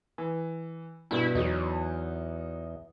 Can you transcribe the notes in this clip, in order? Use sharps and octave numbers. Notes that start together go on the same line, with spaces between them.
E3
G2 B2 E4
E2 F#3 D#4